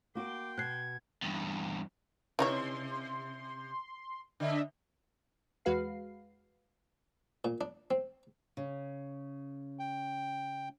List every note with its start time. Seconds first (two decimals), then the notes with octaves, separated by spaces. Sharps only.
0.15 A#3 F#4 G5 C6 D6
0.58 B2 F#6 G#6 C7
1.22 E2 G2
2.39 C3 E3 D#4 C#5 E5 C6
4.40 D3 D4 D#5 E5
5.65 E2 G#3 F#4 B4 F5 C7
7.45 A#2
7.61 D4
7.91 C4
8.57 C#3
9.79 G5